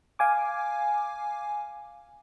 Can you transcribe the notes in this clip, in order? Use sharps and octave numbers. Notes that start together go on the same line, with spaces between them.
F5 G#5 D6